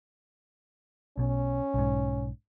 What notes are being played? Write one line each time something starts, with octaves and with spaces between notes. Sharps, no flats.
B1 B2 C#4
B1 G#2